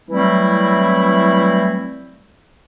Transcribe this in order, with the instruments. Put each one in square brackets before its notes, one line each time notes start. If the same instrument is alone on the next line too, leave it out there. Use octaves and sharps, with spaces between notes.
[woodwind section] E3 F#3 G3 A3 C4 E4